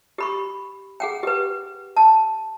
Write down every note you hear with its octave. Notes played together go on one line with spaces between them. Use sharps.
G4 B5 C#6
G#4 F#5 G5
G4 B4
A5